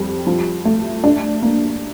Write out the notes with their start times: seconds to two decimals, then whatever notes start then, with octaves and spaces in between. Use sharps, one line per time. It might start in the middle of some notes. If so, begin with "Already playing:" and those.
Already playing: F2 G3
0.27 F3
0.65 A3
1.04 D4
1.42 A#3